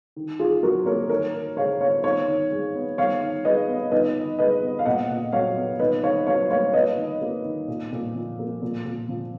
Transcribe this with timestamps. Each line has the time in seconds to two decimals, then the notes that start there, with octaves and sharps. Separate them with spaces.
0.16 D#3
0.39 D#3 F4 G#4
0.63 F#3 F#4 A#4
0.86 A#3 A#4 C#5
1.09 D#3 A#4 C#5
1.34 D#3
1.57 G#3 C#5 F5
1.80 B3 C#5 F5
2.04 D#3 C#5 F5
2.28 D#3
2.51 G#3
2.75 B3
2.97 D#3 C#5 F5
3.22 D#3
3.45 G#3 B4 D#5
3.68 B3
3.91 D#3 B4 D#5
4.16 D#3
4.39 G#3 B4 D#5
4.63 B3
4.79 F5
4.85 A#2 D#5 F#5
5.10 A#2
5.32 F#3 C#5 F5
5.56 B3
5.79 D#3 B4 D#5
6.03 D#3 C#5 F5
6.27 F#3 C#5 F5
6.50 A#3 C#5 F5
6.73 A#3 B4 D#5
6.97 D#3
7.22 A#3
7.45 D#3
7.68 A#2
7.92 A#2
8.15 F3
8.39 A#3
8.62 A#2
8.85 A#2
9.09 F3